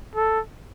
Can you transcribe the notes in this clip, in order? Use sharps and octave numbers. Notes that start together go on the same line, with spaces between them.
A4